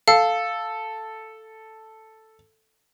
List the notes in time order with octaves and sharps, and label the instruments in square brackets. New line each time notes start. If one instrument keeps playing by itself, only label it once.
[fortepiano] A4 [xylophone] F5